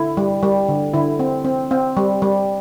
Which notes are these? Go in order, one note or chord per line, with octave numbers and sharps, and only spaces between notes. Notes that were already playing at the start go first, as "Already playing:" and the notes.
Already playing: D3 E4
G3
G3
D3
D3 E4
C4
C4
C4
G3
G3